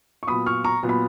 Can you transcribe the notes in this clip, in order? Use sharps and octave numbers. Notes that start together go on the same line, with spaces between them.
C#6
A#2 F#3 B3 B5 D#6
C#6 F6
A#5 C#6
A#2 F#3 B3
B5